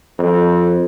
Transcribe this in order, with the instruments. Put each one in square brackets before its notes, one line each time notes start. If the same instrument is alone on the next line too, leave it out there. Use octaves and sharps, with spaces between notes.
[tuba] F2